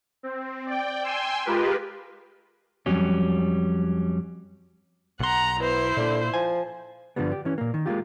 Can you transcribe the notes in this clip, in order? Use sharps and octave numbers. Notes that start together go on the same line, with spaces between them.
C4
D5 G5
G5 G#5 C6 E6
G#3 F4 G4 A#4 B4
F2 F#3 G3 C#4
B1 F#5 A#5 C6
B3 E4 C5
A#2 D3 A#3
F3 G#5
G2 A#2 D3 F3 G3 B3
G4
E3 C#4
A#2 A#3
D#3
G#3 A#3 C#4 F4 G4